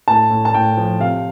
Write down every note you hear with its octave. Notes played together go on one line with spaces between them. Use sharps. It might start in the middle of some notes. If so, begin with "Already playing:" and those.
A2 A5
A2
A5
A2 G5
F3
C3 F5